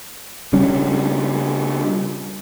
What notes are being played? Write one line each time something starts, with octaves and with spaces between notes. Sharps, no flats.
C#3 G3 C#4 D4